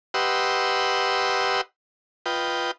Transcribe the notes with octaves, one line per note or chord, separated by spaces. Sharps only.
G4 B4 D#5 F#5 C6 E6
F4 B4 D#5 G5